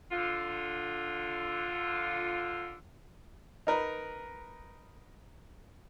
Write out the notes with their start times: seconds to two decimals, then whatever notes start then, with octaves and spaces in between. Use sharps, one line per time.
0.11 D3 F4
3.67 D#4 A#4 B4